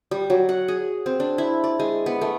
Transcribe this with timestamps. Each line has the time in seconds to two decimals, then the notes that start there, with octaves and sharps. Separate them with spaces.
0.11 G3
0.30 F#3
0.49 F#5
0.68 G#4
1.06 C4
1.20 D4
1.38 E4
1.64 D5
1.80 G#3
2.06 B3
2.21 A3